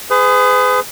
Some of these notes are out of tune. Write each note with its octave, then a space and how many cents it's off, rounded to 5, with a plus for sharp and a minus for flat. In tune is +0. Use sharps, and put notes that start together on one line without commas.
G#4 +0 B4 +40